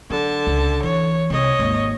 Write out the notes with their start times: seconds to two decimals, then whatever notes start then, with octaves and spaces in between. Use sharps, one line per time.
0.10 D3 F#3 A5
0.47 C#2
0.83 E3 C#5
1.30 C2 C#5 D#5
1.59 G#1 D#2